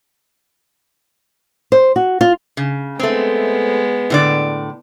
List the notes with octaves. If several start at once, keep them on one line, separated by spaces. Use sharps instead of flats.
C5
F#4
F4
C#3
G#3 A3 B3 C4
A2 D3 D5